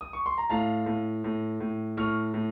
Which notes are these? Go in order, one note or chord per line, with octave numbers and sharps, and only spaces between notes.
D#6
C#6
C6
A#5
A2 F5 A5
A2
A2
A2
A2 C#6 F6
A2